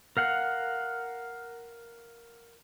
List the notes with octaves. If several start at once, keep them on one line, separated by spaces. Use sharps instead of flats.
A#4 F5 F#5